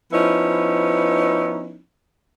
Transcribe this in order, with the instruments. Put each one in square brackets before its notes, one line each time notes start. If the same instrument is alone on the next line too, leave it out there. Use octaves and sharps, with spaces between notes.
[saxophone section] F3 B3 C#4 D#4 E4